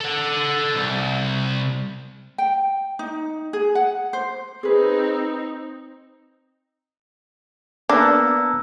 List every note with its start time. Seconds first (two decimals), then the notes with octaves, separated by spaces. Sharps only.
0.01 A4 F#5
0.75 C2
2.38 G5
2.99 D#4
3.53 G#4
3.75 F#5
4.13 C5
4.63 C4 D#4 G#4 B4
7.89 A#3 B3 D4 A#5 E6